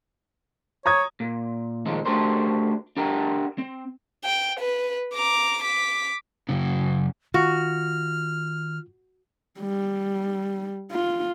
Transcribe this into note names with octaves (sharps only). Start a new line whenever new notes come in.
C#5 A#5 D#6 G#6
A#2
A#2 D#3 F3 G#3 A#3 C4
A3 D4 F#4 G4 A#4 C5
D4 G4 A#4 F#5 G5 A#5
C4
G5
B4
A#5 D6
D6 B6
F#2 C#3
D#3 F4 F#4 F6
G3
F4